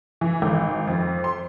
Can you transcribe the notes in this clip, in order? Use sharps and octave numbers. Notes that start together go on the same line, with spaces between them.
E3
G#1
F2
C6